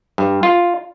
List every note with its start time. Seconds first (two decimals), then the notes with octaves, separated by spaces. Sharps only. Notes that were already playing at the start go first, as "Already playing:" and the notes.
0.18 G2
0.43 F4